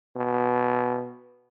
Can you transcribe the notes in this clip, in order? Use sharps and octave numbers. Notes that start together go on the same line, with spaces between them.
B2